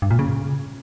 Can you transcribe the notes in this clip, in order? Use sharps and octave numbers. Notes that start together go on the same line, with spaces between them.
G2
A#2
C#3